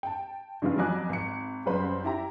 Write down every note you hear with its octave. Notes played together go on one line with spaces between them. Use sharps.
G5 A5
G2 C#3 E3 G#3 F4
F2 F#3 D#5 G#5 D6 F#6
G#1 C#7
F#1 F#2 G3 B4 C5 B5
E4 G4 A#5